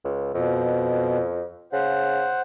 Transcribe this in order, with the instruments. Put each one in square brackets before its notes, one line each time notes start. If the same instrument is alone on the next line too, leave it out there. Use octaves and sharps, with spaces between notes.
[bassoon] C#2
[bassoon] F2 [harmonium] B2
[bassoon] C#3 [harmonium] C5 F#5